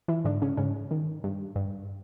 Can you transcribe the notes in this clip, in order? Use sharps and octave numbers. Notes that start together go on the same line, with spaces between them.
E3 E4
G#2 D3 D4
C#3 C#4
G#2 C#3 C#4
D#3
G2
G2